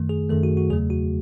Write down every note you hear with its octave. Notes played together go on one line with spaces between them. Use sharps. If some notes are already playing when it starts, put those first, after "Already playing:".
Already playing: F#2 D#3 A3
G#4
F#2 D#3 A3 A4
F#4
F#4
E2 C#3 F#3 A3 G#4
F#4